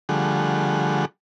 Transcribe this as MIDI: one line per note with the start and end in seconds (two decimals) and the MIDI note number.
0.09 1.05 50
0.09 1.05 53
0.09 1.05 55
0.09 1.05 57
0.09 1.05 68
0.09 1.05 78